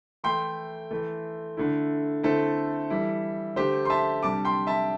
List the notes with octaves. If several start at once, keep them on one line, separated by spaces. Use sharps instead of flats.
E3 A3 E4 G5 C6
E3 A3 E4
D3 A3 E4
D3 A3 C4 E4 A4
E3 G3 E4
D3 A3 D4 G4 C5
C6
E5 A5
C3 G3 D4 A5 D6
G5 C6
E5 A5